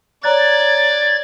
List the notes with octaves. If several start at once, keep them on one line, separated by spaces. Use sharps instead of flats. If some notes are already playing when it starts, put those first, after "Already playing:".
C#5 D5 A#5 F#6 G#6 A6